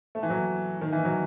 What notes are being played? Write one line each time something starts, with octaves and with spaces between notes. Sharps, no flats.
A3
E3
F#3
D#3
E3
F#3